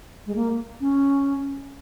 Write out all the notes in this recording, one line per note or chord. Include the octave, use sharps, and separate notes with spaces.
G#3
A#3
C#4